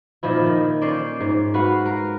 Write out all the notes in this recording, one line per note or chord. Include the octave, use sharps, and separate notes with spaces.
A#2 D#3 F3 E4
D#3
C#4 C5 D5
G#2
F#4 B4 F5 F#5
A#4